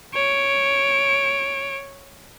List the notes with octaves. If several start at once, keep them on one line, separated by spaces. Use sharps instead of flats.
C#5 D7